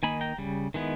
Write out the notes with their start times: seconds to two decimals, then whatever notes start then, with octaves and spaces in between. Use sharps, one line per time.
0.03 D#3 A#3 D#4 G#5 B5
0.21 G5 A#5
0.38 C#3 G3
0.74 D#3 G#3 B3 E4